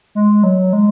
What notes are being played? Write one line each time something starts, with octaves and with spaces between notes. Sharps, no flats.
G#3
F#3
G#3